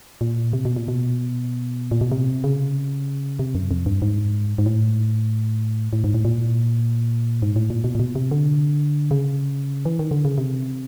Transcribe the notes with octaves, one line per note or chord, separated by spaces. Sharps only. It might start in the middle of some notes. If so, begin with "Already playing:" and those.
A#2
C3
B2
A#2
B2
A#2
B2
C3
C#3
C3
F#2
F2
G2
G#2
G#2
A2
A2
G#2
A2
A#2
G#2
A2
A#2
B2
A#2
B2
C3
D3
C#3
E3
D#3
D3
C#3
C3